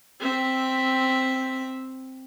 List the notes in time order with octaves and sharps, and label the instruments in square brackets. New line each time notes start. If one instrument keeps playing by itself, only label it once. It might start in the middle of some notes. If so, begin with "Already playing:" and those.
[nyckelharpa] C4 E5